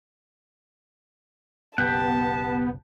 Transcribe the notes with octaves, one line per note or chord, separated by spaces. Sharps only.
F#1 B1 B3 G4 F#5 A5